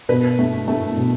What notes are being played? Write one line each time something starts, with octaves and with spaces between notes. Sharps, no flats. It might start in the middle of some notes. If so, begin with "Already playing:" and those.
B2 B4
A3
A3
B2